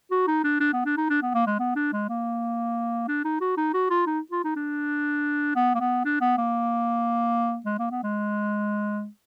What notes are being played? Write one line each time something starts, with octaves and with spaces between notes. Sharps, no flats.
F#4
D#4
D4
D4
B3
D4
D#4
D4
B3
A#3
G#3
B3
D4
G#3
A#3
D4
D#4
F#4
D#4
F#4
F4
D#4
F4
D#4
D4
B3
A#3
B3
D4
B3
A#3
G#3
A#3
B3
G#3